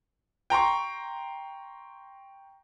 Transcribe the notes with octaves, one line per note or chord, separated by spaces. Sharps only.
G5 A#5 C6 C#6